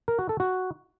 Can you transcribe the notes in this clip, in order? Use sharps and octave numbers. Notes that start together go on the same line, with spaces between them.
A#4
F#4
A4
F#4